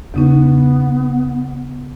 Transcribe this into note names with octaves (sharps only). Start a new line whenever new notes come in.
E2 C#3 B3 D#4